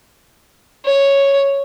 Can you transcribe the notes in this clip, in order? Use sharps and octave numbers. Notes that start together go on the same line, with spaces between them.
C#5